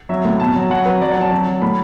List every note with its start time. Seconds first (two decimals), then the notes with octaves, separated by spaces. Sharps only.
0.09 F#3 E5
0.25 A2
0.40 B2 A5
0.55 F#3
0.70 F#3 F#5
0.85 F#3 B4
1.01 F#3 D5
1.12 F#5
1.17 F#3 A5
1.31 F#3 A5
1.48 F#3
1.62 A2 B5